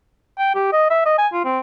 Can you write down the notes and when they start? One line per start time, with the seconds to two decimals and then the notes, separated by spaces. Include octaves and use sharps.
0.38 G5
0.55 G4
0.72 D#5
0.90 E5
1.05 D#5
1.18 G#5
1.33 F4
1.45 C4